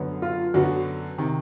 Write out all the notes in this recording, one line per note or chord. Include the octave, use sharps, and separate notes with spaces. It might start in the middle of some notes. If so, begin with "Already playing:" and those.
Already playing: F#2 D3 F#3 B3
F4
F#2 D3 F#3 B3 F#4
C3 D#3